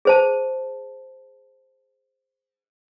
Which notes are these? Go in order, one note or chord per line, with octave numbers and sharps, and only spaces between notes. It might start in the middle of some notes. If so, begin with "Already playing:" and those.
G#4 C5 A5